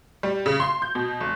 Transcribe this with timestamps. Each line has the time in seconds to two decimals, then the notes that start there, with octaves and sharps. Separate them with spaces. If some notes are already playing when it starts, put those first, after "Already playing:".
0.23 G3
0.46 C#3
0.60 C6
0.82 G6
0.95 B2
1.20 F1